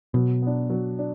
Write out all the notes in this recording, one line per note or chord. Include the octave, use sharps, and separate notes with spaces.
B2 F#3
B3 D4
F#3
D4